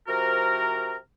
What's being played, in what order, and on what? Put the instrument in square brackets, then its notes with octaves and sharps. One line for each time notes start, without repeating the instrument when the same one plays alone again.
[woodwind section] C3 F3 F#4 A#4